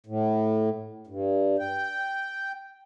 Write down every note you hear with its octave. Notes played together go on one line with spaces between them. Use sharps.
A2
G2
G5